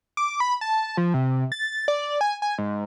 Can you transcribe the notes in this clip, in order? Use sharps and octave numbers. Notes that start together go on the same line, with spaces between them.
D6
B5
A5
F3
C3
A6
D5
G#5
G#5
G#2